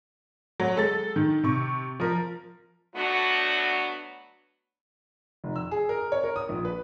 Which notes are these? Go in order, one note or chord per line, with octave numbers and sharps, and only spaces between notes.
F#3
G#3 A4 A6
D#3
C3 C#6
F3 A#4
F#3 A3 B3 D4 F#4
F1
E6
G#4
A#4
C#5
A#4
D#6
A#1
B4